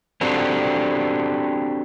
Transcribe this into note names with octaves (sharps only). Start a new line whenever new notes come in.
C4 D4 F#4 G4 A4 C5